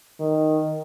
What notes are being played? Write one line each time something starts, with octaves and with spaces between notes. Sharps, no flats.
D#3